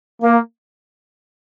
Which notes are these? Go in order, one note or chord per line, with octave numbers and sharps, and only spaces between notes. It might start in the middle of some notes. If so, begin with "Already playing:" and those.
A#3